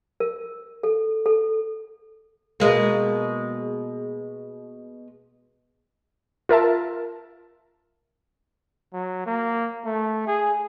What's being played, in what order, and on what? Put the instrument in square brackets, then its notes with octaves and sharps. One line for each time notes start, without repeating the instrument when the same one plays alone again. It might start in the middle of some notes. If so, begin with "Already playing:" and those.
[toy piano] A#4
A4
A4
[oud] B2 G#3 A#3
[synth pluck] F4 A#4 E5 A5
[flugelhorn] F#3
A#3
A3
G#4